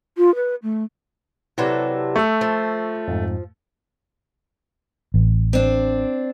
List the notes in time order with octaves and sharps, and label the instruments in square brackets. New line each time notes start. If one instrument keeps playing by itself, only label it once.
[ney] F4
B4
A3
[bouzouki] C3 F#3 A4 [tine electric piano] E4 B4 D5
[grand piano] A3 [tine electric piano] C#6 E6
[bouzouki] F3
[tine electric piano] F2 G#2
[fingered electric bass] A1
[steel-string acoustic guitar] C4 D4